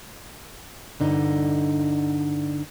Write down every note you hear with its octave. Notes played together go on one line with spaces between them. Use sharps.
G2 D3 D#4